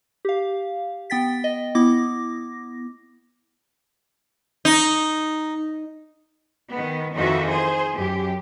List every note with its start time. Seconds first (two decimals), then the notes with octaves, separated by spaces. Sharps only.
0.25 G4 F5
1.10 B3 G5 A6 B6
1.44 D#5
1.75 B3 E4 D6 A#6
4.65 D#4
6.71 D#3 B3
7.14 F2 D#3 E3 D#4 F#4 E5
7.46 G#4 C5
7.93 F#2 G4